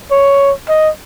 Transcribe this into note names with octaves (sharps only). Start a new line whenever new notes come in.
C#5
D#5